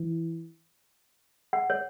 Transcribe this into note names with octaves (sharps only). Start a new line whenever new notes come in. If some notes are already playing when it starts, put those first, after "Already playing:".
Already playing: E3
F#5
C#5